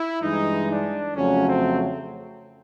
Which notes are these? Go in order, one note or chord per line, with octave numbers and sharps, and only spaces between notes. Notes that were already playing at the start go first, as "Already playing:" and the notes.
Already playing: E4
G2 E3 G#3 D#4
D4
F2 C#3 F#3 A3 C#4
C4